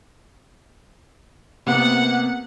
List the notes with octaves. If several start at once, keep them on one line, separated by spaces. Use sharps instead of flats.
C3 A#3 B3 F#5